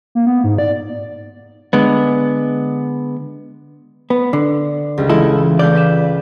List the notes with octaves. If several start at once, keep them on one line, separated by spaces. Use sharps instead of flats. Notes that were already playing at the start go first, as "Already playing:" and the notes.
A#3
B3
G#2
D5
D3 G#3 B3
B3
D3
C#2 G3
E3 G#3 E4 F4 A4
A3 D5 F5 G6
B4 B6 E7